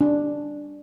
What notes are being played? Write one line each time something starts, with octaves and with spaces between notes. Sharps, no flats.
D4